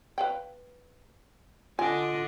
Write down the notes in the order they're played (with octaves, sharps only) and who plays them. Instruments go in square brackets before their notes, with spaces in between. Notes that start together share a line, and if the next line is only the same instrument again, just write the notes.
[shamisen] B4 F5 G5
[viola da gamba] D3 D4 D#5 [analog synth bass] F4 [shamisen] G#5